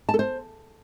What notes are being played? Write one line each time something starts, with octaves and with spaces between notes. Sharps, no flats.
A5
A4
C5